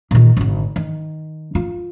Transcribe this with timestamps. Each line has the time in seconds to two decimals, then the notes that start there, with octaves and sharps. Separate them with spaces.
0.11 A#2 D#3
0.37 G#1 D3
0.76 D#3
1.55 F4